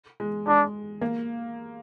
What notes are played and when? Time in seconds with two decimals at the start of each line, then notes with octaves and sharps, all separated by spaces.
0.20 G#3
0.47 G#3 D4
1.02 A#3